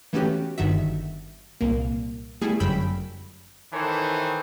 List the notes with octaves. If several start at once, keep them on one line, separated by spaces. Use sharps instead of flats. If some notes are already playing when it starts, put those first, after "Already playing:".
E3 A3 B3 C#4 F#4 G4
G1 G2 D#3 D#4 F#4 E5
C2 A#2 A#3
G3 A3 B3 E4 G#4
G1 F#2 C#3 G5 B5 E6
D#3 E3 A4 C5 C#5